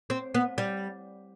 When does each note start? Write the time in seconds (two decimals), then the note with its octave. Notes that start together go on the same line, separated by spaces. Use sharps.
0.10 C4
0.34 B3
0.58 G3